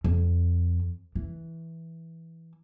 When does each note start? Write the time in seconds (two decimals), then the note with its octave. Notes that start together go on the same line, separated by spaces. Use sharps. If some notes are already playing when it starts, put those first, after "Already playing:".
0.04 F2
1.15 E3